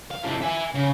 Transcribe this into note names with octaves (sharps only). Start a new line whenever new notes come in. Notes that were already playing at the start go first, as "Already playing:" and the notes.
F5
F2 A2
E5 G#5
C#3